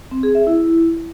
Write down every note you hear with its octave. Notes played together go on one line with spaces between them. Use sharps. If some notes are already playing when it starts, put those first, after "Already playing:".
C4
G#4
E5
E4